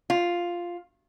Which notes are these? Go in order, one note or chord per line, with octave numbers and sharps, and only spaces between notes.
F4